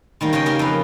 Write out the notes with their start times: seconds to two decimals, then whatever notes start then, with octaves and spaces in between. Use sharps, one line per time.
0.21 D#3 G3 A#3
0.33 C#3 D#5 G5
0.46 A#3 G4 G#4 A#4
0.59 F2 B4